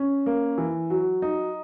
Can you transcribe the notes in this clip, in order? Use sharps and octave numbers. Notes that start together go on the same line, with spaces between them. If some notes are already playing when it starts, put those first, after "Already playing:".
Already playing: C#4
A#3
E3
F#3
D#4